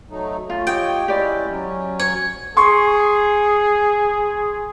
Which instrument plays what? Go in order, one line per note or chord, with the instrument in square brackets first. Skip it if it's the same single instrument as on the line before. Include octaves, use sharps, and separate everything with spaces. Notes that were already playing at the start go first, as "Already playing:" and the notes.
[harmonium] F#3 A3 D#4
[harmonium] A3 C#4 [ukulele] F4
[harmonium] G4 C#5 D#5 [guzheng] G5
[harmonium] G#3 C#4 E4 [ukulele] G4 D5
[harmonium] F#3 C#4
[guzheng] C#5
[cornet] G#4 [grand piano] C6 C#6